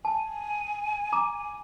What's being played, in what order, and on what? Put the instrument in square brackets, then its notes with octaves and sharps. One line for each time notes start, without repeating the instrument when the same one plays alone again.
[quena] G#5 [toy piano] A5
[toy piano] A#5 D6